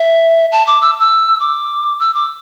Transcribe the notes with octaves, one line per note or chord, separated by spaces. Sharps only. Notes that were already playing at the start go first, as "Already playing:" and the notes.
Already playing: E5
A5
D6
E6
E6
D6
E6
D6